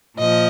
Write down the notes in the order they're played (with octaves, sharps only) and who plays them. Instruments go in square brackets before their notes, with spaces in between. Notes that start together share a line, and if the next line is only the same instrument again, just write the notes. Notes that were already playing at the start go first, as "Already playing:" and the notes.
[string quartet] A#2 F3 [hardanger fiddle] D#5